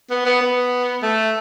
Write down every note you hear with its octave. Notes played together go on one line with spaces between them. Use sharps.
B3
B3
B3
A3